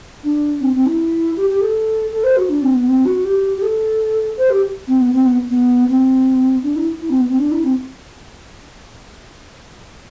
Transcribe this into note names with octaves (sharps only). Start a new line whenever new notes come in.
D4
C4
C4
E4
G4
G4
A4
A4
C5
F#4
D4
C4
B3
C4
F#4
G4
G4
A4
C5
G4
C4
B3
C4
B3
B3
C4
D4
E4
E4
C4
B3
C4
D4
E4
C4